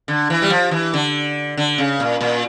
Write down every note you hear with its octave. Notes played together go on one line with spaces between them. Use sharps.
D3
E3
G3
F3
E3
D3
D3
C#3
A#2
A#2